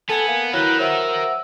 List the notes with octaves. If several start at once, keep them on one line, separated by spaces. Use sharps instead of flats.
B3 A4 G#5
A#3
F#3 E4 A#4 B4 G5
F#3 C5 E5 F#5 E6